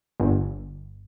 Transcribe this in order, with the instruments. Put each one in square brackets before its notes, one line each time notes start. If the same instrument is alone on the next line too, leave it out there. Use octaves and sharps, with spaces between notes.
[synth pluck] G1